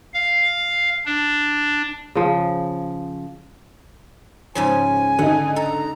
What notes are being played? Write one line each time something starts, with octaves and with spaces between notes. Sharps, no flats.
F5
D4
C#3 F3
G#2 C#3 F3 G#5
D3 D#4 F#5
A4 A#5